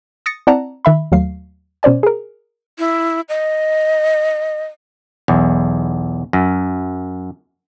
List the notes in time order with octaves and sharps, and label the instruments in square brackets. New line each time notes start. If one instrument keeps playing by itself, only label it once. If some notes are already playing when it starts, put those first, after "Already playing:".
[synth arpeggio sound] D#6 A6 A#6 C#7
C4 E4 D5 F#5 A5 A#5
D#3 E5 B5
D#2 F#3 A3 F5 C7
B2 C#4 C5 D5 G#5
G#4 A#4
[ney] E4
D#5
[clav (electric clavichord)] B1 E2
F#2